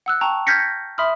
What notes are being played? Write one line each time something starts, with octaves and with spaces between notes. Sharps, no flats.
F#5 E6 F#6
G5 A5 A#5 C#6
F6 G6 G#6 A#6 B6 C#7
E5 B5 C6 D#6 F6